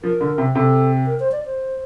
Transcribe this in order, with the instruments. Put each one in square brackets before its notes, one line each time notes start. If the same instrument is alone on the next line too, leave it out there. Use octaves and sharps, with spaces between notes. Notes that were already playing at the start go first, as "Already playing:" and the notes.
[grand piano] F3 [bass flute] A#4
[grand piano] D3
C3
[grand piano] C3 [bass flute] A4
[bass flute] A#4
C5
D5
C5